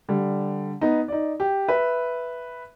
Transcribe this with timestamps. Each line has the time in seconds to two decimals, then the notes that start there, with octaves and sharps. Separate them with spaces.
0.09 D3 G3
0.81 B3 D#4
1.08 D#4 D5
1.40 G4
1.68 B4 E5